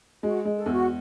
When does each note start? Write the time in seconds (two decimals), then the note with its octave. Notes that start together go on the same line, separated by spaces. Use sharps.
0.23 G#3 F#4
0.45 G#3
0.56 A4
0.66 E2
0.72 F#4